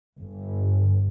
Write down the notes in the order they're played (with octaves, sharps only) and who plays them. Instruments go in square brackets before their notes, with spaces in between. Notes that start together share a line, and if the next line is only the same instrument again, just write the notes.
[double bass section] G1